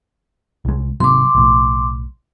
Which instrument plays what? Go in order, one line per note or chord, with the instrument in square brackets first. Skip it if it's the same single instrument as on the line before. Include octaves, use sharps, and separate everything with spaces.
[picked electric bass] C2 G#3
[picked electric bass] G#1 C3 F#3 [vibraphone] C6 D6
[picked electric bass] B1 A2